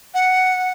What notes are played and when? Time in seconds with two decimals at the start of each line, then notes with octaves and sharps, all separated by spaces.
0.14 F#5